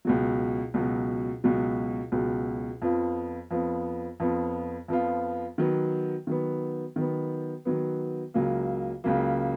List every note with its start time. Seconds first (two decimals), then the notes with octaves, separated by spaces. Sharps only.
0.05 C#2 B2 F#3
0.74 C#2 B2 F#3
1.44 C#2 B2 F#3
2.12 C#2 B2 F#3
2.82 F2 F3 B3 F4
3.51 F2 F3 B3 F4
4.20 F2 F3 B3 F4
4.88 F2 F3 B3 F4
5.58 D#3 F#3 B3
6.27 D#3 F#3 B3
6.96 D#3 F#3 B3
7.65 D#3 F#3 B3
8.34 C#2 C#3 F#3 A#3
9.04 C#2 C#3 F#3 A#3